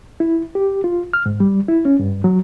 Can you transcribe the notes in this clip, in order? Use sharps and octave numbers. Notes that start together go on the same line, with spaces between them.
E4
G4
F4
F6
G#2
G3
E4
C#4
G2
F#3